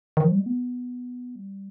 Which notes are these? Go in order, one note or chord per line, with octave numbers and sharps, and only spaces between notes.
D#3
F3
G3
G#3
B3
G3